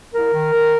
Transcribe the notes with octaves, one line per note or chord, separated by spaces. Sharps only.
C2 A#4
D#3
D#3